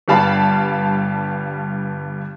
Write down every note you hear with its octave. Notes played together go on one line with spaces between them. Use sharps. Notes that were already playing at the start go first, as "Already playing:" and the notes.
G1 G2 G3 F5 A5 B5